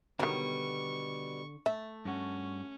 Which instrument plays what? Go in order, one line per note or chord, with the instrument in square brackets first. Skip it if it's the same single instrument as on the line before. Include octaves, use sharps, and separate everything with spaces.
[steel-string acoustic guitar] B2 G3 [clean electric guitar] D3 [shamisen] D#3 F#3 [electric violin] C#6
[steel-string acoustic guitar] A3 [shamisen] E5
[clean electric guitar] G2 F#4 [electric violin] C#4